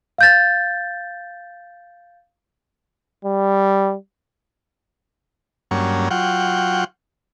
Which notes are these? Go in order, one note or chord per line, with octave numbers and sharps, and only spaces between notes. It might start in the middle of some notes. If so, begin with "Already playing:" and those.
F5 G6 A6
G3
G2 F#3 A#3 C#4
F#3 F4 F#5 G5